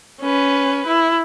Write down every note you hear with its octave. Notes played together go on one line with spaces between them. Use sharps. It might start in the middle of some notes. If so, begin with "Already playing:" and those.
C#4 B4
E4